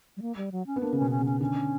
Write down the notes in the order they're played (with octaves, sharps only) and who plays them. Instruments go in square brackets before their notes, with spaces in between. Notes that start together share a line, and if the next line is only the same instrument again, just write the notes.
[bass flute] G3
A#3
G3
F#3
C#4
[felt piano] B3
[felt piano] A#3 [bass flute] D4
[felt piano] C#3
[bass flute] C#4
[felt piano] B2
[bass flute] C#4
[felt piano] C#3 [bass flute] C#4
[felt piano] D3 [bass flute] C#4